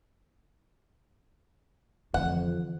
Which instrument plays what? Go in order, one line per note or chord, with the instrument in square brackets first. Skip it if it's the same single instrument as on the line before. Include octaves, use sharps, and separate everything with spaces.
[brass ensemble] F2 [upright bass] D3 E3 [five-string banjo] F#5